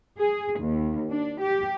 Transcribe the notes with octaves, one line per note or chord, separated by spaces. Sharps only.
G#4
D#2
D4
G4